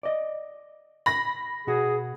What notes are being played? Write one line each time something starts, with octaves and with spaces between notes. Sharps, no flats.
D5 D#5
B5 A#6
B2 F#4 G#4